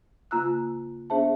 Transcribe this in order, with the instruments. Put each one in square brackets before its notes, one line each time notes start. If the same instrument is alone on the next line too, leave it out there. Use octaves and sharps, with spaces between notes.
[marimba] C#3 A#3 F4 A#5 E6 F#6
B3 D4 G#4 C5 E5 A5